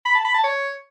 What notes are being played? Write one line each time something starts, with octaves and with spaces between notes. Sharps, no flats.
B5
A5
B5
A5
C#5